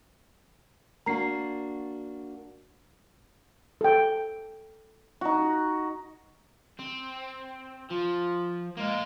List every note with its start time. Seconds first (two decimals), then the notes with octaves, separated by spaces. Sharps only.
1.06 A#3 D4 F#4 A#5 C7
3.81 A4 G5
5.21 D#4 F#4
6.79 C4
7.91 F3 F4
8.77 G#3 A#3 F4